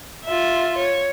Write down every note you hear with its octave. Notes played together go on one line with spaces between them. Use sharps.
F4 E5
C#5